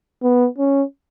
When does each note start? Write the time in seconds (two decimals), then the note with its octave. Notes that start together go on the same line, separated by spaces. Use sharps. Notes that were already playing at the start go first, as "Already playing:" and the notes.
0.23 B3
0.58 C#4